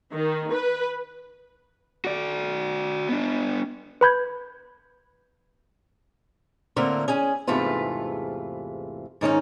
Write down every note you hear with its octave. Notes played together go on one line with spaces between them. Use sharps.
D#3
B4
F#4 D5
B3 D4
B4 B5 G6 G#6
A2 D3 A#3 C4 A#4
C#4 G#4 G#5
E2 G#2 C3 A3 F4 B4
G#2 D#3 C#4 D#4